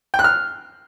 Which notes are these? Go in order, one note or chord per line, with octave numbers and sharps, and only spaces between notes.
G5
F#6
F6